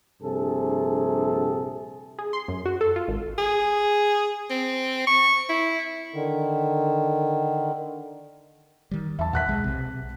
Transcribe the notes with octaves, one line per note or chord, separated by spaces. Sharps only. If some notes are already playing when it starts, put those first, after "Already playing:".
A#1 G2 C3 G#4 A4
G#4
C6
F#2
F#4
A4
F4
G#1
G#4
C4
C#6
E4
D3 D#3
D#3 G3
E2 E5 A5
D#2 A#2 F#5 F#6 B6
B1 G#3
B1 C3